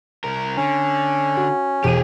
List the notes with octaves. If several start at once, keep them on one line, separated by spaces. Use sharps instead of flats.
C2 A#4
D3 C#4
F#4
E1 G4 G#4 D#7